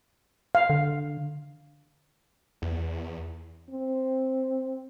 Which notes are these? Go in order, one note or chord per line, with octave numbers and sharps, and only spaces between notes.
F5
D3
E2
C4